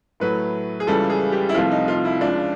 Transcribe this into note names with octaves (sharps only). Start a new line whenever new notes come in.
A2 F#3 A3 B4
G#4
C#2 C#3 E3 G3 A4
G#4
G4
E4
C2 C3 F3 A3 F4
D#4
F4
E4
C#2 C#3 F3 D4